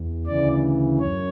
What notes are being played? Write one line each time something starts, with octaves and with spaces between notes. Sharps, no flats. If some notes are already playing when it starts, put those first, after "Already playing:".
Already playing: E2
D2 C#3 E3 D5
F#2 C#5